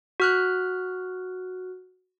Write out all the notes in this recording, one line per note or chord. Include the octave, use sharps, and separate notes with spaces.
F#4 F6 F#6